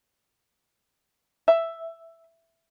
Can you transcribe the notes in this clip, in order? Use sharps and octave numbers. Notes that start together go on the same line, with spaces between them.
E5